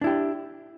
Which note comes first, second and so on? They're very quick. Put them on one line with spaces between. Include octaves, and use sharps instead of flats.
D4 E4 G4